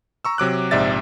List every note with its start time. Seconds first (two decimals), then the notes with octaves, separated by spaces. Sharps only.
0.25 A#5 C#6 E6
0.38 C3 F#3 D6 F#6
0.71 A#1 G#2 C3 D5 E5 A6